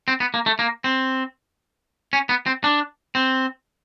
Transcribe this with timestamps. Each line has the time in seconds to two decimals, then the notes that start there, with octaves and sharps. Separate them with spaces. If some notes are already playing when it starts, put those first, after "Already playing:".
0.08 C4
0.20 B3
0.34 A#3
0.46 A3
0.59 A#3
0.84 C4
2.13 C#4
2.29 B3
2.46 C4
2.64 D4
3.15 C4